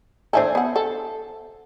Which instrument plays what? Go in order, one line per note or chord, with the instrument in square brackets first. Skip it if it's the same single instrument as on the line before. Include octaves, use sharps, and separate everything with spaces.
[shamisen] D4 E4 A4 [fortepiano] C5 E5 G#5
[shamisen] B3 F#5
A4 F#5